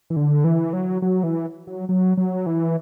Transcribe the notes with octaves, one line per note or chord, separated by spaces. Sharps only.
E3
D3
E3
F#3
F#3
E3
F#3
F#3
F#3
E3